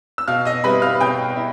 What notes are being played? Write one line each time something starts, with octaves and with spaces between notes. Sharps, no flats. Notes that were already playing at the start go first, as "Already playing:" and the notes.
E6
B2 F5 F6
D#5 D#6
G3 C4 E4 B4 B5
F5 F6
B2 G5 G6
E4